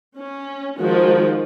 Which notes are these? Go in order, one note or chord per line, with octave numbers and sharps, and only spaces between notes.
C#4
D#3 F3 G#3 F#4